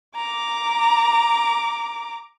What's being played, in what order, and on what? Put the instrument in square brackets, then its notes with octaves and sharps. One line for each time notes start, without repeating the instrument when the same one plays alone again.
[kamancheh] A#5 D6